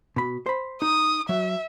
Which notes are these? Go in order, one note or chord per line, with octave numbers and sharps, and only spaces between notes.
B2 B5
C5 B5
D#4 D#6
F#3 E5